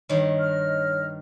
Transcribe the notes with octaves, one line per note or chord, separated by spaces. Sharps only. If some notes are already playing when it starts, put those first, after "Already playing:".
G2 D#3 C#5
D#5 F6